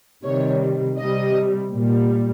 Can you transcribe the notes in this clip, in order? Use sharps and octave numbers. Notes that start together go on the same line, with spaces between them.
C3 D#3 G3 C#5
C3 G3 D#5
A#2 G3